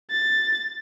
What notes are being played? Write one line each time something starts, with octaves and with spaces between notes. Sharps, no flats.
A6